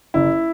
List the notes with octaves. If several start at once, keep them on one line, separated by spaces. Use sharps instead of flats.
F#1 E4